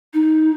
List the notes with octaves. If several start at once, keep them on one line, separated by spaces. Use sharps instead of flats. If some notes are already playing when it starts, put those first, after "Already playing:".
D#4